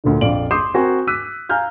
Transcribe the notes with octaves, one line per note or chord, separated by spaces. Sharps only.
D2 A#2 D3
A#1 F2 D5 F5 D7 F#7
C6 D6 D#6 G6 C7 E7
C4 F#4 A#4 G#5
D6 E6 F#6 B6 D#7
F5 G#5 A#5 F6 G6